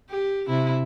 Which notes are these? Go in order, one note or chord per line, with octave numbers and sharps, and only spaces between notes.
G4
C3 E4